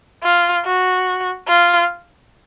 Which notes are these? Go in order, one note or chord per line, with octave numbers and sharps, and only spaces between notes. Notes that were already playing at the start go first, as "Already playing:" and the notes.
F4
F#4
F4